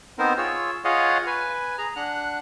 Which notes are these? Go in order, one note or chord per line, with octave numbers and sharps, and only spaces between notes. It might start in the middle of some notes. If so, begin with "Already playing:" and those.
B3 C4 D#4 A#4 C5
F4 G#4 C#5 E6
F4 G#4 C#5 D#5 F5 F#5
B4 G#5
G#4 A#5
D4 F#5 F#6